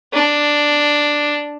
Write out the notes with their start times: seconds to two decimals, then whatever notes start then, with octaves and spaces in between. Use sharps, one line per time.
0.13 D4